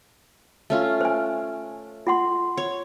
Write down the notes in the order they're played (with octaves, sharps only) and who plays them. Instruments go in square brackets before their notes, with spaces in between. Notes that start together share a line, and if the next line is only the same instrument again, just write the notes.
[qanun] A3 C#4 F4
[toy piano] C5 G#5
F4 F#5 C6
[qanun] C#5